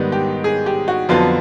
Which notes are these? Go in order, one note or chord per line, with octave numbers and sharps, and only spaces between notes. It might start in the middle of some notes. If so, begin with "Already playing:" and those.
Already playing: G#2 D#3 G3 B3 D#4
G4
G#4
G4
F#4
F2 D3 F#3 B3 F4